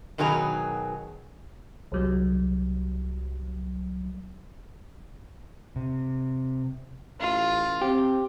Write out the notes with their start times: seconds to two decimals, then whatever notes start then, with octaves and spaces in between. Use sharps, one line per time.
0.18 B2 D#3 F#3 G#4 G#5 A#5
1.92 C2 F#3 G3
5.76 C3
7.21 A1 F4
7.82 C4 G4